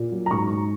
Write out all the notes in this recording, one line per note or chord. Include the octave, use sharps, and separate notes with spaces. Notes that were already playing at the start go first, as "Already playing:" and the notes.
Already playing: A#2
F#3
A#5
G#2 C#6
G#2